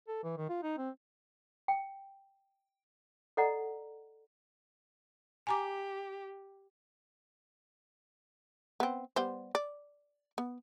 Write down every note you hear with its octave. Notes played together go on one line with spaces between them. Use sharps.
A4
E3
D#3
F4
D#4
C4
G5
A4 D5 D#5 F#5 A#5
G4 G#5 A#5 D6
B3 C4
G3 B3 C5
D5
B3